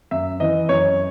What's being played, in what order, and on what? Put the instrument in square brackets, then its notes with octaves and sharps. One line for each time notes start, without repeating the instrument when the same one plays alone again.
[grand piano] F#2 E5
E3 D#5
F#2 C#5